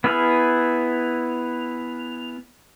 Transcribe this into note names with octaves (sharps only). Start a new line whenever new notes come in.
B3 E4 G#4 F6